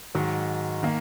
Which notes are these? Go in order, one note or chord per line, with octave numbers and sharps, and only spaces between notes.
G#2 D#3 F#3
D#3 A#3